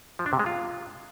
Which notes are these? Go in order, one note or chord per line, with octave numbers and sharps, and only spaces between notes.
F3
D4
C3
G#3
F4